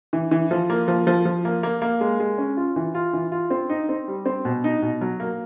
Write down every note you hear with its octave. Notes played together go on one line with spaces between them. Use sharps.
E3
E3
F3
A#3
F3
F3
F3
A#3
A#3
A#3
G#3
G#3
C#4
F4
E3
F4
E3
F4
C4
D#4
C4
G3
C4
B2
D#4
B2
F#3
A#3